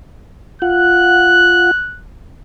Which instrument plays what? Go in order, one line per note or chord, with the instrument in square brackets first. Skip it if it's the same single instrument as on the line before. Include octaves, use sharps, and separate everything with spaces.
[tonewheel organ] F4 F#5 [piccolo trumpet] F#6